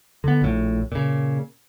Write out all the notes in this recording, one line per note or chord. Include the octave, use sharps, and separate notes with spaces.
D3 B3
A#1 A2
A#2 C#3